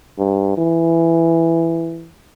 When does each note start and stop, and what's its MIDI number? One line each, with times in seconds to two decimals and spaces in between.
0.19 0.55 43
0.58 2.08 52